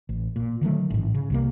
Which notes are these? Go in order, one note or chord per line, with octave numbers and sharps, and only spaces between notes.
A1
A#2
D3 D#3 F#3 A3
A1 G#2
C#3
C2 C3 A#3